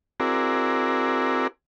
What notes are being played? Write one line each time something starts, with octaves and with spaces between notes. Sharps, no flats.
C4 E4 F#4 G#4 A#4 D5